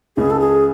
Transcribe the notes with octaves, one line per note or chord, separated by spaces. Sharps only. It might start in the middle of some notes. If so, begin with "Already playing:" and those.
C#2 C#3 G#4
A4
G#4